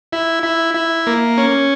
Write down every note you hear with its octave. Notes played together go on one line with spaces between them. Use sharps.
E4
E4
E4
A#3
C#4